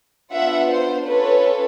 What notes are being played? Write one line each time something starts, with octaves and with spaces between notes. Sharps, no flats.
B3 D4 F4 E5 F#5
C5
C#4 F4 A4 B4 C#5